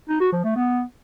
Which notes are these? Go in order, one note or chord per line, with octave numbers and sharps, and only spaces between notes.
D#4
F#4
F3
A3
B3